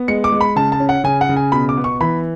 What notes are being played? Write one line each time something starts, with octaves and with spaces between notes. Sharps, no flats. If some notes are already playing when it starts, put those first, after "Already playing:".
Already playing: B3
G#3 C#7
D6
G#3
B5
C#3 A5
A5
C#4
F#5
C#3 G#5
F#5
C#3
G#5
B2 B5
D6
B3
C#6
E3 B5